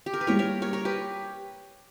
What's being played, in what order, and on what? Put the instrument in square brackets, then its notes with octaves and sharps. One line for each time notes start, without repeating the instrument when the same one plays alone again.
[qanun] G4
A#4
B4
[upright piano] G3 A#3 E4 [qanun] A#4 C#5
[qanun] A#4 C#5
A#4 C#5
A#4 C#5
G4 B4